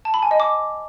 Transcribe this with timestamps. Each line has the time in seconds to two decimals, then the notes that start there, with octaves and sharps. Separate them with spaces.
0.05 A5
0.14 B5
0.22 G#5
0.31 D#5
0.40 D6